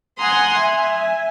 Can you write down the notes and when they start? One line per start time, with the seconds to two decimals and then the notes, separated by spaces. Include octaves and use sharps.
0.18 F#5 G#5 A#5 C6 D#6
0.58 E5 G#5